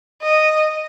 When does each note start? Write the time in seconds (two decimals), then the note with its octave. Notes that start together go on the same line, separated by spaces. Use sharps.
0.22 D#5